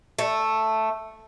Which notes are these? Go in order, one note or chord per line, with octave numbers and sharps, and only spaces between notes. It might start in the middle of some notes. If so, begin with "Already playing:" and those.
A3